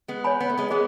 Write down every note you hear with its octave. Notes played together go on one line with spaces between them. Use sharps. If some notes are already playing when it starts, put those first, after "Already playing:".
G#3 B3
C#5 G#5 B5
B3
A3
G#3 B3
G#3 B3 G#4